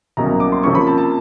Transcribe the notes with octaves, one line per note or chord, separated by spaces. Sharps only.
C2 B2 F#3 A#3 C#4 A#5
D6
C6
C3 F3 A#3 C#4 C#6
B5
A5
A5